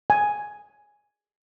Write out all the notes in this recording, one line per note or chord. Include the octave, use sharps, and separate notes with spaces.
G#5